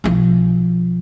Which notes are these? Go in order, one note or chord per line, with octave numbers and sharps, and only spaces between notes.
B1 F3